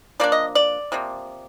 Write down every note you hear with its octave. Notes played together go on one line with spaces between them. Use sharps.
F3 A#3 D4 D5
D#5
D5
C3 F3 A#3